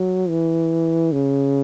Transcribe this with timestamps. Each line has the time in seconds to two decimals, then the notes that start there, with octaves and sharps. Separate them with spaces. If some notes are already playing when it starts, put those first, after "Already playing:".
Already playing: F#3
0.29 E3
1.12 C#3